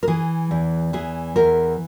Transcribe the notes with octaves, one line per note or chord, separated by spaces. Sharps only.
A#4
E3 G#4
E2
E3 G#4
E2 A#4